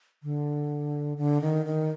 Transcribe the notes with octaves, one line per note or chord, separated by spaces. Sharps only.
D3
D3
D#3
D#3